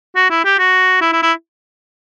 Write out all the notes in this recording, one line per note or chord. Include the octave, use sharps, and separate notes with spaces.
F#4
E4
G4
F#4
E4
E4
E4